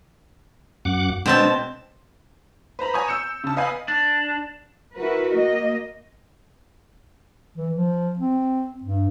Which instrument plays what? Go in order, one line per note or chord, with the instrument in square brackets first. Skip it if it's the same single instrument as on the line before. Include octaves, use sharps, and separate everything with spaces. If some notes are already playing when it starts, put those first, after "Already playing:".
[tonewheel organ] F#2 F#5 D6
[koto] B2 C4 A5 [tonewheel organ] G#3 D4
[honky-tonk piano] B4 C5 A#5 B5
C#5 G#5 A#5 C#6 D#6
E6 G6 C#7 E7
C#3 A5
B3 D#5 F5 G#5 B5
[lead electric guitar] D4
[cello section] E4 F#4 A#4 B4
A#3 D#5
[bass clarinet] E3
F3
C4
G2